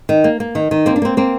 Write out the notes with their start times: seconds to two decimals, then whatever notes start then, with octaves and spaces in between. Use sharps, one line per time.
0.09 D#3
0.24 A#3
0.40 A#3
0.55 D#3
0.71 D#3
0.86 A#3 C4
0.96 D4
1.02 A#3 C4
1.17 A#3 C4